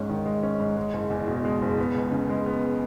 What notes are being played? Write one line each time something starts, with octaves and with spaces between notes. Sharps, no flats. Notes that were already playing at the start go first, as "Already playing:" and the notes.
Already playing: G#1 G#2 C#4
D#3
G#3
C#4
G#2
G#3
F#1
E2
B2
G#3
F#1
B3
C#2
C#3
G#3
B3